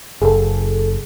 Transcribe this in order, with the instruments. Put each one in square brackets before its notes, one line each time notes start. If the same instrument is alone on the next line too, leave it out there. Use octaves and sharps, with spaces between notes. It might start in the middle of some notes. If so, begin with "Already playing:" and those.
[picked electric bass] F#1 [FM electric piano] G#4 A4